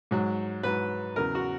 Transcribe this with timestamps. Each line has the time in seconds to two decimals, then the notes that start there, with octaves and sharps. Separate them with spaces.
0.11 G#2 F#3
0.63 G#2 F#3 B4
1.16 E2 C#3 F#3 A#4
1.35 F#4